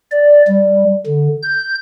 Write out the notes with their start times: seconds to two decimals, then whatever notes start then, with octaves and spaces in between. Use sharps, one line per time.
0.11 D5
0.47 G3
1.06 D3
1.42 G6